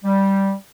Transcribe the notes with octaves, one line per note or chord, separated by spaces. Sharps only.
G3